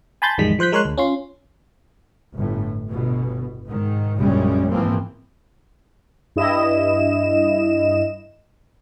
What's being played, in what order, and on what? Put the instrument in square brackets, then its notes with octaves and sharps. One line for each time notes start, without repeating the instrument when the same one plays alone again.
[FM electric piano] G#5 A5 B5 C6 G6 A6
A1 F2 D#3 G3 G#3 B6
F3 C5 F#6 G6 B6
G#3 A#4 C#5 C6 F#6
D2
C#4 F4 C6
[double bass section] G1 A2
G1 B2
G#2 D#3
A#1 F#2 C#3 G3 G#3 C#4
G#2 E3 F3 A#3 C4
[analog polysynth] G2 E4 D#5 E7